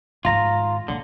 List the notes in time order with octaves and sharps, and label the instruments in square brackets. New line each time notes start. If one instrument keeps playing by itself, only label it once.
[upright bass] G#2 D#3 [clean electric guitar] F4 A#5
[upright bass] D1 A#2 [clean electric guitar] D3